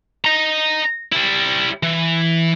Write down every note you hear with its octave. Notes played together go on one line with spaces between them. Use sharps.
D#5 A#5
G3 E4
E3